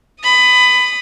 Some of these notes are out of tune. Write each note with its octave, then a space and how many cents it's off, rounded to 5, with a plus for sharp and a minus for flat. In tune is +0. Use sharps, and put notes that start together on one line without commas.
B5 +20 D#6 -15